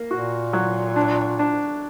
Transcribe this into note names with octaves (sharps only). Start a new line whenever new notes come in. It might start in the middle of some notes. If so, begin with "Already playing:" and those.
Already playing: A#3
A#2 F#4
F#3
D4
D4